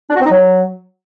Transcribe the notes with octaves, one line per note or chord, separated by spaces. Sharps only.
D4
F#4
C4
D#4
F#3